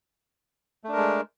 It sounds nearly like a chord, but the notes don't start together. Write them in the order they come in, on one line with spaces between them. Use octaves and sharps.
A3 D4 A#4 G#3